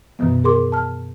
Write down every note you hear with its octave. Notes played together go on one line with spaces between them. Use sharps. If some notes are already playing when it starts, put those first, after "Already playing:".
F#2 B2 D#3 E3 B3
G#4 A#4 C6 D6
A5 F6